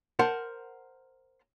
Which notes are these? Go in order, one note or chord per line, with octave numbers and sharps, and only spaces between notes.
A#4 C5 F#5 A5 C6